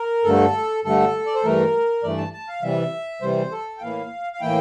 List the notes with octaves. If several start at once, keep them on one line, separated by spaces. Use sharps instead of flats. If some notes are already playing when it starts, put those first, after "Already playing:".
Already playing: A#4
G2 D3 A3 A4
G2 D3 A3 A4
D5
C5
G2 E3 A3 A#4
G2 E3 A3 D5
A5
A5
F5
C3 E3 G3 E5
C3 E3 G3 C5
A4
G5
A2 E3 A#3 E4 F5
F5
A2 E3 A#3 E4 G5